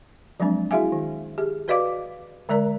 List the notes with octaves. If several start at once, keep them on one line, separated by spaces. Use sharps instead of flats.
F3 F#3 G#3 C4 D4
E4 F#4 G#4 E5 F5 G#5
D#3
G4 G#4
F#4 B4 D5 D#5 F5 D6
D3 G#3 A#4 D5 A#5